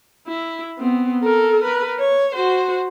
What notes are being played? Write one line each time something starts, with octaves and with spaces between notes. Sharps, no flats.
E4
B3 C4
A4 A#4
A#4 B4
C#5
F#4 C5